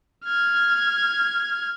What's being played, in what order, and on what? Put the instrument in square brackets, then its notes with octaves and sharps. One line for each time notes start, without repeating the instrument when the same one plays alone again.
[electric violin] F6 G#6